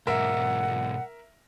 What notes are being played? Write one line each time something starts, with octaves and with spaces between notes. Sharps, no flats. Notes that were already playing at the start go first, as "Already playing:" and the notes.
B1 G#2 A#4 E5 F#5